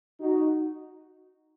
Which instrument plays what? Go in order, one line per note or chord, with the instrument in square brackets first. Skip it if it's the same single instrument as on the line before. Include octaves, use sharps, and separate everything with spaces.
[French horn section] D#4 F#4